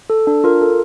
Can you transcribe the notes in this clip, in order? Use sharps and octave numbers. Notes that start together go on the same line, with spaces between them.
A4
D4
F4 A#4
A4